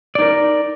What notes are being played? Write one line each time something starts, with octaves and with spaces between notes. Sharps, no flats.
D#4 A#4 D5